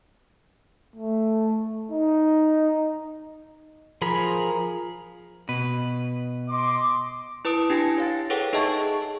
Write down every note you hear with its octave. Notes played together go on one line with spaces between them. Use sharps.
A3
D#4
F3 G#4 A#4 B5
B2 B4
D#5 C6 D6
E4 B4 A5 D#6 D7
D4 E4 G4 G#5 A#6 C#7
C#5 F5 A6
G#4 A4 B4 C#5 F#5 G5
D#4 G#4 D#5 E5 A5 C#6